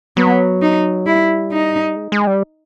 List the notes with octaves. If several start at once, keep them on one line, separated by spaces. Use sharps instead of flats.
F#3 B3
D#4
G3 E4
D#4
G#3
G#3
G3